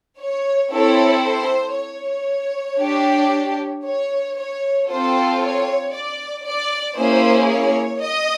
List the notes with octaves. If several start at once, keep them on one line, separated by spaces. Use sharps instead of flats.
C#5
C4 E4 A4 C#5
C5
C#5
D4 G4
C#5
C#5
C4 F4 A4 C5
C#5
D5
D5
A#3 C#4 E4 G#4 C5
C#5
D#5